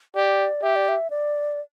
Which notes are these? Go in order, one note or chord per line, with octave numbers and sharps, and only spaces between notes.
G4 D5
G4 E5
D5
E5
D5